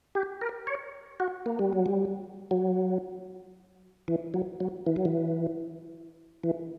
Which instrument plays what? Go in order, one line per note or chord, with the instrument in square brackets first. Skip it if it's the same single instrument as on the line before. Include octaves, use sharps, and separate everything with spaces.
[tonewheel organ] G4
A#4
C#5
F#4
A#3
G3
F#3
G3
F#3
E3
F#3
F#3
E3
F#3
E3
E3